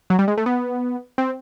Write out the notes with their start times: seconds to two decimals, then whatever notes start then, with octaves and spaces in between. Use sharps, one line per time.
0.10 F#3
0.19 G3
0.28 G#3
0.38 A3
0.46 B3
1.18 C4